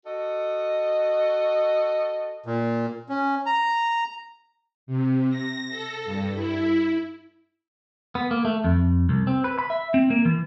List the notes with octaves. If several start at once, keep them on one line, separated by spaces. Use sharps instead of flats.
F#4 A4 D#5
A#2
C#4
A#5
C3
A#6
A4
G2
E4
B3
A#3
A3
F2
C2
C4
B4
B5
E5
C4
A#3
E3